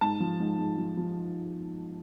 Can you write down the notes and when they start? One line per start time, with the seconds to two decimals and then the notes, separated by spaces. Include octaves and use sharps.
0.01 G#2 A5
0.20 F3
0.40 G#2
0.59 G#2
0.78 F3
0.97 F3